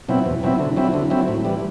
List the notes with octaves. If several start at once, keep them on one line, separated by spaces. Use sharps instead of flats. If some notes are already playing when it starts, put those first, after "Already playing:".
B2 F#3 C4 E4
E2
B2 F#3 C4 E4
D3
F#3 C4 E4
D3
F#3 C4 E4
A2
E3 G3